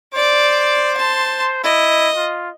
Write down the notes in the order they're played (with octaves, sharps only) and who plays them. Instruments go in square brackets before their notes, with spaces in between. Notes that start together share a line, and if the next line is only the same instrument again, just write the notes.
[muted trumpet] C5 [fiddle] D5 D6
[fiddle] A5 C6
[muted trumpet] E4 [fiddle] D#5
[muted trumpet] F4